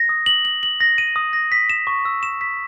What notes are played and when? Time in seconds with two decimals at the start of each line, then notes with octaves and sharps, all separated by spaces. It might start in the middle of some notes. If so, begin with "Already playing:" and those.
Already playing: A#6
0.09 D#6
0.26 F#7
0.45 F#7
0.63 F#7
0.80 A#6
0.98 D#7
1.16 D#6
1.33 A#6
1.52 B6
1.70 E7
1.87 C#6
2.05 E6
2.23 E7
2.41 B6